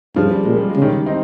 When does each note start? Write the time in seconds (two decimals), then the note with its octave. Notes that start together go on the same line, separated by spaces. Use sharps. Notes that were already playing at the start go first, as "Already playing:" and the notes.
0.16 G2 C#3 F3
0.31 G3
0.44 A#2 G#3
0.57 G3
0.70 G#3
0.76 C#3
0.82 D#3 G3
1.06 C4 D#4